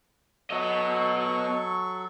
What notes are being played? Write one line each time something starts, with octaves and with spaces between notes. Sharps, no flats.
F#3 B3 A4 D#5 C#6